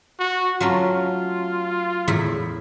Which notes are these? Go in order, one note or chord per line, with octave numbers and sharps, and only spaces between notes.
F#4
F#3 A3 C#4 F4
E2 A2 E4